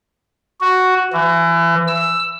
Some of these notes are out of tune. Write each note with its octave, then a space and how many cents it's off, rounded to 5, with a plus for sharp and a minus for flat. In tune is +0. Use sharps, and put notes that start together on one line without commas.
F#4 +0
E3 +30
E6 +10